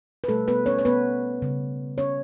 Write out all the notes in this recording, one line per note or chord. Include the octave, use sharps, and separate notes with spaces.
B4
B2 G3 A3 A4
B3 B4
C#4 C#5
C#5
B3 B4
C#3 G3
C#4 C#5